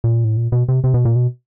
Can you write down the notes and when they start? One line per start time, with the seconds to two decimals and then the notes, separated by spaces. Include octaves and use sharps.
0.04 A#2
0.24 A2
0.37 A#2
0.52 B2
0.69 C3
0.84 C3
0.94 B2
1.05 A#2
1.16 B2